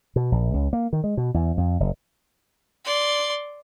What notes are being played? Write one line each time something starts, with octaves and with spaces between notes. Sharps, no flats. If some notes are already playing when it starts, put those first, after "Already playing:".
B2
A#1
C#2
A#3
D#3
G#3
B2
E2
F2
F#1
D5 C6